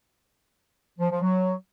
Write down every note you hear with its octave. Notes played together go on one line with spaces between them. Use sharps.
F3
F3
F#3